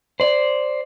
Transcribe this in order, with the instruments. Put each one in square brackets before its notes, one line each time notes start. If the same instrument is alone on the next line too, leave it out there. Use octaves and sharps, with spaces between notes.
[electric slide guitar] C5 D5